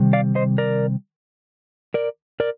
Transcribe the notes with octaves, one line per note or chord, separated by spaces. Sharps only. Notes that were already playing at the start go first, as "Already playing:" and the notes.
Already playing: C3 D#3 G3
D5 F5
C5 D#5
A#4 D5
A#4 D5
A#4 D5